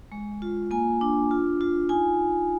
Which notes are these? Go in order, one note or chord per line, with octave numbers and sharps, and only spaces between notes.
G#3
F4
A#3 G#5
D4
F4
F4
D#4 G#5